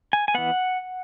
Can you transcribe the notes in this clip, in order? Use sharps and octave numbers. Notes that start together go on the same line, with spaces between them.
G#5
G#5
E3 B3 F#5